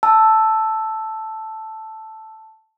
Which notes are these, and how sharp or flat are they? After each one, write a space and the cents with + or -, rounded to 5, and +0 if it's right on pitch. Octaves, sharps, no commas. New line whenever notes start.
A5 +0 E6 +0